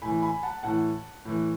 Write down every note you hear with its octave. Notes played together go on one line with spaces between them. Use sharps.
A2 E3 G#5 B5
G#5 B5
F#5 A5
A2 E3 F#5 A5
A2 E3